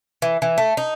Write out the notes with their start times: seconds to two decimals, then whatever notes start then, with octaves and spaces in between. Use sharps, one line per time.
0.22 E3
0.42 E3
0.58 A3
0.77 D#4